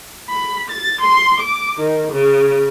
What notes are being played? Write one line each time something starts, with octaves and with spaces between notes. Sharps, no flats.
B5
A6
C6
D6
D#3
C#3